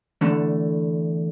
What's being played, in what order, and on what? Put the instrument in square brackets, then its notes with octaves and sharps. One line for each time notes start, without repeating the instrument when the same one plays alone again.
[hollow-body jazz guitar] E2 D3 A3